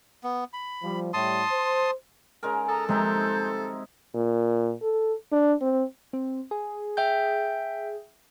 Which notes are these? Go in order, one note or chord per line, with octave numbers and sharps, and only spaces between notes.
B3
B5
F3 G3
A2 G3 A5 C6 D#6
C5
C#3 G#3 A#4
A4 A#5 D#6
C3 G#3 D#4 E4 A#5 C6 G6
A#2
A4
D4
C4
C4
G#4
E5 G5 G6